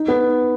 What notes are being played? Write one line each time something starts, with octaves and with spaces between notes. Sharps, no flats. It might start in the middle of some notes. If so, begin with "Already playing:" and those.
Already playing: D#4
B3